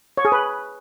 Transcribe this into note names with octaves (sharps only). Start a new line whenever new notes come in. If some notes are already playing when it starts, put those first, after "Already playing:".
C#5
G#4
B4